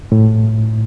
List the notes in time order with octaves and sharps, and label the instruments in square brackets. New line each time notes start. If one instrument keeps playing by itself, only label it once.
[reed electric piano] A2